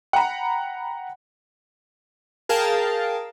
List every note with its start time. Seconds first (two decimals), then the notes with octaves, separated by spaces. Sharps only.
0.13 F#5 G5 A#5 B5
2.49 G#4 A#4 F5 G5 A5